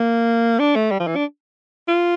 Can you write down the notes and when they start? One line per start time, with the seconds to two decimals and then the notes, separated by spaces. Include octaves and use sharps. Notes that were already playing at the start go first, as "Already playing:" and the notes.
Already playing: A#3
0.59 D4
0.75 A3
0.91 G3
1.00 F3
1.07 E3
1.16 D4
1.88 F4